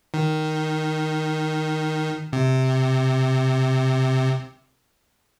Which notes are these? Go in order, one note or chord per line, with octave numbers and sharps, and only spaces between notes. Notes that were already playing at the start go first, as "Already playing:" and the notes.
D#3
C3